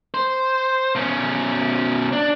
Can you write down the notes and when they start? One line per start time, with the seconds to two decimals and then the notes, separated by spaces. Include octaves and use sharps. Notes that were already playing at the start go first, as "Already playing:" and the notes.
0.14 C5
0.95 B2 C#4
2.12 D4